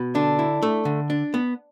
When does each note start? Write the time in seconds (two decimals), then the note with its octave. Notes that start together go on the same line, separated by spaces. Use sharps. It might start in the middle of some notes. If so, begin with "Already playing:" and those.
Already playing: B2
0.15 D3 D4
0.39 E4
0.63 A3
0.85 D3
1.10 D4
1.34 B3